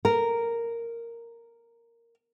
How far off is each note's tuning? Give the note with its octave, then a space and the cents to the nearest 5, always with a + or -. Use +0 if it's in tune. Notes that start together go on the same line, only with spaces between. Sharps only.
A#4 -5